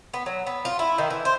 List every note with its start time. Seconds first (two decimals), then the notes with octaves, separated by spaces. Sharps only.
0.14 B3
0.26 F#3
0.47 B3
0.65 F4
0.79 E4
0.98 D#3
1.10 E3
1.25 C5